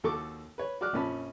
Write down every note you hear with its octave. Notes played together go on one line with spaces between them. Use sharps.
D#2 F#4 A4 A5 C#6 D6
B4 C#5
F#4 D5 D6 F6 F#6
A#1 F2 A#2 C#4 A5 B5